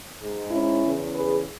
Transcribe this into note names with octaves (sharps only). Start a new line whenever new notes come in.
G#2 G#3
C#4 E4
E2 C#3 E3
G#4 B4